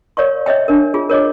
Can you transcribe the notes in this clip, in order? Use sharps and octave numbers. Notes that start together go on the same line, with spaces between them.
A#4 C#5 D5 F5 C#6
C#5 D#5 E5 G5
D4 A#4
F4 G#4
A#4 C#5 D#5 D6